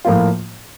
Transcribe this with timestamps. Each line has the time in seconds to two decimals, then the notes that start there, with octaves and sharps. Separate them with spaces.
0.05 A2 F3 A#3 F4